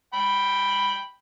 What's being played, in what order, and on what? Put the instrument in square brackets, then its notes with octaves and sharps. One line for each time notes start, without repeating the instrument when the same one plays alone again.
[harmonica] G5 B5